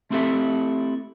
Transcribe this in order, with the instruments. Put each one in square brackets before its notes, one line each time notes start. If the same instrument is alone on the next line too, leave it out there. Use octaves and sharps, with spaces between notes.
[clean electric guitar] A3 C4 E4 G4 A4 E5